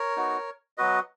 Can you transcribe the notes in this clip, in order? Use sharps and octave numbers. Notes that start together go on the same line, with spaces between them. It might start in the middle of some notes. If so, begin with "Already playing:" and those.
Already playing: A#4 C#5
B3 D#4 F#4
F#3 B3 F#4 B4 D#5